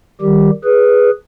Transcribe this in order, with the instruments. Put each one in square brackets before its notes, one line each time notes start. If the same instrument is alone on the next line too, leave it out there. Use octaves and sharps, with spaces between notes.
[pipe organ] D#3 G3 G4
G#4 B4